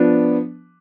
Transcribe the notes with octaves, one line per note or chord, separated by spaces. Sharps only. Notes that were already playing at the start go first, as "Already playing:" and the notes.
Already playing: F3 B3 D4